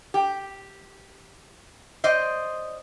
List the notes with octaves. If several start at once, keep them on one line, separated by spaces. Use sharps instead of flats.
G4
C5 D5 D#5